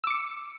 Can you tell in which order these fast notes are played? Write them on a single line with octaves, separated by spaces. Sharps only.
E6 D6 C#7